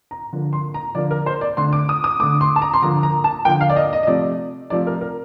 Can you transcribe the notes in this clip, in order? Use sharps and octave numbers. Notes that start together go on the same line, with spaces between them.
A#5
D3 F3 A#3
C6
A#5
D3 F3 A#3 D5
A#4
C5
D5
D3 A3 C6
D6
D#6
D#6
D3 A3 D6
C6
A5
A#5
C6
D3 F3 A#3 A#5
A#5
A5
D3 F3 A#3 G5
F5
D5
D#5
D#5
D#5
C3 F3 A3 D5
C3 F3 A3 D5
A#4
A#4